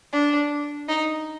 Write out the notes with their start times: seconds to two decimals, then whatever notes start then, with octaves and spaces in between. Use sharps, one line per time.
0.13 D4
0.89 D#4